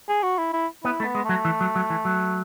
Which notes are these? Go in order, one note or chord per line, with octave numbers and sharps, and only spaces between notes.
G#4
F#4
E4
E4
B3 E4
A3
B3
G#3
F#3 A3
E3
F#3
F#3
E3
F#3